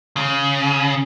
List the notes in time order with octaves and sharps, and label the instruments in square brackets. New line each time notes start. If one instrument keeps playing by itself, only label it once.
[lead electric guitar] C#3